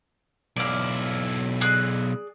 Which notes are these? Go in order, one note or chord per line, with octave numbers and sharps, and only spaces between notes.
B1 E4 D5 F5
G#4 D5 F#6